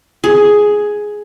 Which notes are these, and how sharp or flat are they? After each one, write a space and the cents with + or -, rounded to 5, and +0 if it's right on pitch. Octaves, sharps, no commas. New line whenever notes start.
G#4 +5